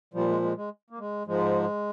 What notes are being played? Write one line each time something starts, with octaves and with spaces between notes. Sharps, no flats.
A#2 F3 G3
G#3
G#3
G#3
A#3
G#3
G#2 F3 G#3